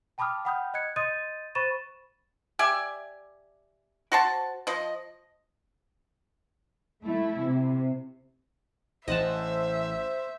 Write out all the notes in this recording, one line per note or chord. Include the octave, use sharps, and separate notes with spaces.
G5 A5 B5 D6 D#6 F6
F#5 G5 B5 D#6 F6 G6
D#5 F#6 G#6 C#7
D#5 C6 D#6 G6 A6 D#7
C5 B5 C#6 A6 D#7 E7
G4 D5 E5 G#5
F#4 C5 A5
F3 D#5
A3 E4
C3
A1 C5 D#5 E5 F#5 A5